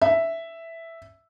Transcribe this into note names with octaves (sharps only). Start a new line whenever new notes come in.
E5